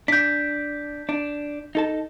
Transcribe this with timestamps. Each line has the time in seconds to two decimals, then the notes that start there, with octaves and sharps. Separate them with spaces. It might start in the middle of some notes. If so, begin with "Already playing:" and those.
0.08 D4 G6 B6
1.09 D4
1.75 D#4 A4 A5